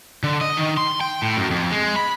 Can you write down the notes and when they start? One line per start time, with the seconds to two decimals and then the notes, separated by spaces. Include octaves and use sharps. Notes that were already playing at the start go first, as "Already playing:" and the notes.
0.24 D3
0.41 D#5
0.57 D#3
0.77 C6
1.01 G5
1.22 A2
1.37 F#2
1.50 F2
1.71 G#3
1.96 B5